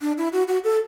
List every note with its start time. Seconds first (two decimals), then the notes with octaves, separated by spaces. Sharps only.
0.01 D4
0.18 E4
0.33 F#4
0.48 F#4
0.64 A4